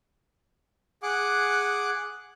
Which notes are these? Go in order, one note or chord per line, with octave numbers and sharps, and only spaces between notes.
G#4 F#5 D6 F#6